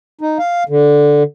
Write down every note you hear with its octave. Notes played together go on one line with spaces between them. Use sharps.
D#4
F5
D3